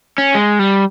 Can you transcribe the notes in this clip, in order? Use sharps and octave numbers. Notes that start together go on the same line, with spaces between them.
C#4
G#3
G3